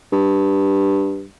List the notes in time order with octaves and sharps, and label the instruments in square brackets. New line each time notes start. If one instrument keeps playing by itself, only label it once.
[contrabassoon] G2